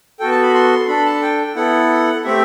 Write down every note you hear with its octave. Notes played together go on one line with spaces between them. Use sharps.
B3 F#4 A4 G5
A5
B5
C6
D4 A4 B5
A5
G5
B3 E4 A4 F#5
A3 C4 G4 E5